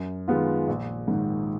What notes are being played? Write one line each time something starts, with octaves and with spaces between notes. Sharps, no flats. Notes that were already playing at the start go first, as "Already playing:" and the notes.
Already playing: F#2
D#3 G#3 B3 F4
A#1
G#2 D#3